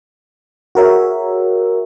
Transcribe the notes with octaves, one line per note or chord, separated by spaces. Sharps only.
F#4 G#4 A#4 C#5 E5